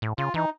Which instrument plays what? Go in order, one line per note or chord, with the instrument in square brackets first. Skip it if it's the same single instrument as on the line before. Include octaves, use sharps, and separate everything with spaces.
[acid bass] A2
[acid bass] C#3 [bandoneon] F4
[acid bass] E3 [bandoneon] D#4